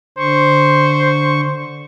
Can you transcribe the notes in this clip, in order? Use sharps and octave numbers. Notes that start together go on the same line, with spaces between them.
D3 C5 C#6